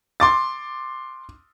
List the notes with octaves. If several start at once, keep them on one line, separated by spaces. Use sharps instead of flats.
C6 D6 A6